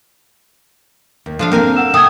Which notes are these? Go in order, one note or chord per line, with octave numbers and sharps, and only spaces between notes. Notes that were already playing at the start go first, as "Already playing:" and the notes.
D#2
F3 A3 D4 F5
A#3 C4 G4 A#4 G#5
F#5 E6 E7
C3 A3 G5 D#6 G#6